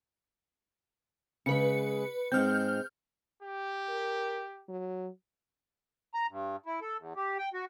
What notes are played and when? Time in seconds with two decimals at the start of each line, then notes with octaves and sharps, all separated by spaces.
1.46 C#3 G#3 B4 C#7
2.32 G#2 G#3 C4 F6 G6
3.43 G4
3.89 A#4
4.68 F#3
6.14 A#5
6.30 G2
6.66 E4
6.82 A4
6.98 E2
7.16 G4
7.38 G5
7.54 F#4